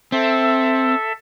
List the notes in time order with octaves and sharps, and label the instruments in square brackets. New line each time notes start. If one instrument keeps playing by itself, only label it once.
[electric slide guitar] C4 [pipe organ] A4 E5